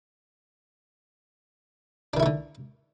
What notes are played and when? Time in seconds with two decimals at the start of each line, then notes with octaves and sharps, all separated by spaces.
2.13 D4
2.17 D#3
2.20 E4
2.23 A3
2.26 D3